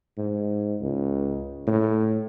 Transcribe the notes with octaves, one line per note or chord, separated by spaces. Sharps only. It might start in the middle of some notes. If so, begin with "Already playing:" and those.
G#2
C#2
A2